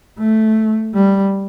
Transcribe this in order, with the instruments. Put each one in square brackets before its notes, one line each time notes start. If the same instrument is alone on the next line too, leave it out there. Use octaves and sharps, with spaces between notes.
[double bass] A3
G3